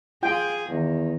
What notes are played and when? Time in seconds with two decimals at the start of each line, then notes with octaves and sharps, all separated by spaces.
0.23 F4 G#4 G5
0.69 E2 D#3